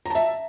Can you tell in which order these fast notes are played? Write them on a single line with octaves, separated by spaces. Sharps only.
A#5 A5 E5